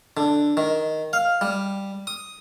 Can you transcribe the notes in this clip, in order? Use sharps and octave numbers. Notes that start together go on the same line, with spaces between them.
D3
D#3
F5
G3
D#6